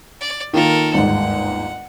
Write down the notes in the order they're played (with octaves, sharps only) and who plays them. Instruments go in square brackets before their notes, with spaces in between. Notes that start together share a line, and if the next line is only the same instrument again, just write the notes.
[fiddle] D5
[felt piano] D#3 A#3 F4 [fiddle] A4 A#4
[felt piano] G1 D#2 G#2 [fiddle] F#5